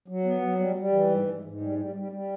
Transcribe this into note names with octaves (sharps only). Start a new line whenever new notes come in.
F#3
B3
F#3
G3
G3
E3
G#2
G#2
G#2
G3
G3
G3
G3